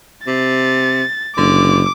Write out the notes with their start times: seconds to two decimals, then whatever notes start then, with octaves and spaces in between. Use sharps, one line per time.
0.27 C3 A6
1.37 F#1 D3 D6